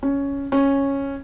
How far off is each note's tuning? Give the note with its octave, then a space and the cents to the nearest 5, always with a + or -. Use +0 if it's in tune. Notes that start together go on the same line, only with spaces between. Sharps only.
C#4 +10
C#4 -5